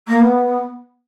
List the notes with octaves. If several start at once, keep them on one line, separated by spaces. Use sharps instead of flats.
A#3
B3